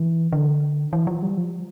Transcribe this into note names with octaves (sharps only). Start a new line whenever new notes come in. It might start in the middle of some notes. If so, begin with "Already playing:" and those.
Already playing: E3
D3
E3
F3
G3
F3